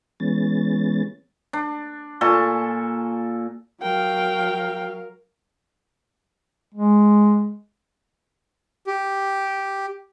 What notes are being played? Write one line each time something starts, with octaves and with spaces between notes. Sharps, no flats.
E3 G#3 B3 C#4 A6
D4
A#2 A4 G#5 C#6
F#3 A#4 F5 G5
G#3
G4